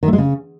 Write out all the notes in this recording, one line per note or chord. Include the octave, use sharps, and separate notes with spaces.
D#3
A3
G#3
C#3